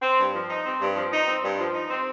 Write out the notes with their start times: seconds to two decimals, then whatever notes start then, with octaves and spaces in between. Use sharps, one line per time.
0.02 C4
0.18 G2
0.34 F3
0.49 D#4
0.65 C4
0.80 G2
0.95 F3
1.12 D#4
1.27 C4
1.43 G2
1.58 F3
1.73 D#4
1.90 C4